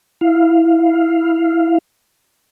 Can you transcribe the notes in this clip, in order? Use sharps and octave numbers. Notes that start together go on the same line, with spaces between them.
E4 F5